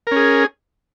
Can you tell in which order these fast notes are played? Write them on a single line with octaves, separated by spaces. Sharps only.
A#4 C#4 G#4